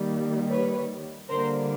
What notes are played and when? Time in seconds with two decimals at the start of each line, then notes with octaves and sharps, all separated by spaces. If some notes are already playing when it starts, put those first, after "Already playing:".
Already playing: D#3 G3 A#3
0.50 B4 C#5
1.30 D3 G3 A#3 A#4 C5